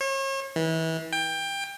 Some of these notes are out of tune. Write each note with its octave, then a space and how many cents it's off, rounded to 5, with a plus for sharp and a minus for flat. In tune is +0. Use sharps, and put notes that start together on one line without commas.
C#5 -40
E3 -30
G5 +20